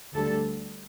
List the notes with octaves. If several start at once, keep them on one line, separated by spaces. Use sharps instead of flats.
D2 D3 G3 A4